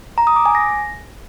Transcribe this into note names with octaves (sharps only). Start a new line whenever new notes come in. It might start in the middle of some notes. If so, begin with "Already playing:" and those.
A#5
D#6
D6
G#5
A#6